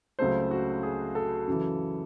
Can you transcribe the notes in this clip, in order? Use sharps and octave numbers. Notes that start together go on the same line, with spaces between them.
C#2 C#3 F#3 A3 C4 C5
F#4
G#4
A4
F#2 C#3 E3